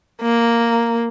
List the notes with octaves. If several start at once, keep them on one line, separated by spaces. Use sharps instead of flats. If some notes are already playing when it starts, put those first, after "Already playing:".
A#3